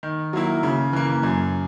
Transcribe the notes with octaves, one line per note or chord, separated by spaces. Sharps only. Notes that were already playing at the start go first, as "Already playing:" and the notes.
D#3
F#3 A#3 E4
C#3
E3 A#3
F#2